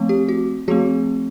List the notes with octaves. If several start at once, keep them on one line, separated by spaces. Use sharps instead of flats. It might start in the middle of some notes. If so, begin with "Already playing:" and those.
Already playing: F3 A3 C4
G4
F#4
F3 A3 C4 F#4 G#4